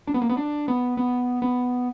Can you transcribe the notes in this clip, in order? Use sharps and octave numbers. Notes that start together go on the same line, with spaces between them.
D4
B3
A#3
B3
D4
B3
B3
B3